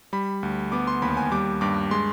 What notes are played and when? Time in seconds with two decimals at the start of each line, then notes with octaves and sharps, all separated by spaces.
0.13 G3 B5
0.43 D2
0.72 B3 D6
0.87 C6
1.02 D#2 B5
1.17 G#5
1.32 G3 D6
1.61 G2 D6
1.91 G#3 C6